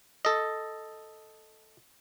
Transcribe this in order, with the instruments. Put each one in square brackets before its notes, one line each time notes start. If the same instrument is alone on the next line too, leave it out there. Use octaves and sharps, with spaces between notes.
[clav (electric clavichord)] A4 D#5